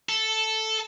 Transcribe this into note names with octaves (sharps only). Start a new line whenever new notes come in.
A4